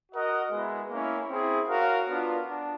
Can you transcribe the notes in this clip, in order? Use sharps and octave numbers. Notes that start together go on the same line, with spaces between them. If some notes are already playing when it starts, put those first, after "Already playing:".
F#4 A#4 D#5 F#5
G#3 B3 E4
A#3 C#4 E4
C4 E4 G#4
F#4 A#4 C#5 F5
B3 D4 F4
D4